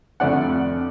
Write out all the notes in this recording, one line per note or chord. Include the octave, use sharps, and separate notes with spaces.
F2 D3 A3 D5 F#5